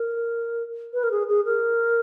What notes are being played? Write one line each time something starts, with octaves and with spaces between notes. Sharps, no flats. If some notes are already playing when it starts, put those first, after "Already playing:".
Already playing: A#4
B4
A#4
G#4
G#4
A#4